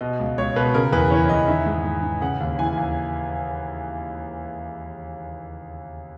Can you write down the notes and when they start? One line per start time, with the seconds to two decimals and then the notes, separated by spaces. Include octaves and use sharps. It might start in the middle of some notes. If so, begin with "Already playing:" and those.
0.01 B2 D#5
0.19 C#2
0.38 C#2 C#5
0.56 B2 B4
0.74 C#3 A#4
0.92 E2 B4
1.11 E3 C#5
1.29 E2 D#5
1.48 D#3 E5
1.66 G#2
1.85 G#2
2.03 D#3
2.21 C#3 F#5
2.40 D#2
2.59 E3 G#5
2.77 D#2